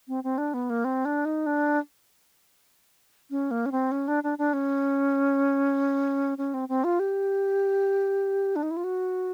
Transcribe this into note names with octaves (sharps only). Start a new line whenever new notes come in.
C4
C4
D4
B3
A#3
C4
D4
D#4
D4
C#4
A#3
C#4
C4
C#4
D4
D4
D4
C#4
C#4
C4
C4
F4
G4
D4
D#4
E4
F4
F#4